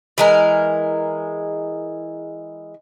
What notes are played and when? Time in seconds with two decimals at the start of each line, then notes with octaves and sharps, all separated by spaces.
0.18 E3 G#3 A#4